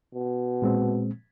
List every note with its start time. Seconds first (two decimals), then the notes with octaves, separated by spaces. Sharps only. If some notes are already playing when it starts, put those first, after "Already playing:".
0.14 B2
0.62 A#2 G#3 C4